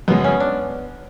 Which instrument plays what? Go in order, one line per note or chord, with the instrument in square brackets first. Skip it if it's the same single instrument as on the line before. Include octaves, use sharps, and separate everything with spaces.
[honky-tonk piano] F#2 C#3 G#3 [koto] B3
[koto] C#4
D4